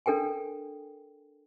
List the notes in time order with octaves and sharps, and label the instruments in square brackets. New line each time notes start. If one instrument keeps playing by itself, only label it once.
[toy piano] D4 A4 A#4 G5 G#5